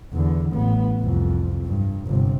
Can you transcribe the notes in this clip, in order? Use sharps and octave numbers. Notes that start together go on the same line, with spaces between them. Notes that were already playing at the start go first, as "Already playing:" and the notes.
E2 D3
A1 B3
C2 F2
G2
G1 C3